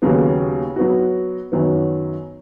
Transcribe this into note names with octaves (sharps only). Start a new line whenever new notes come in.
D#2 C#3 F#3 B3
F#3 B3 F#4
F#2 D#3 F#3 B3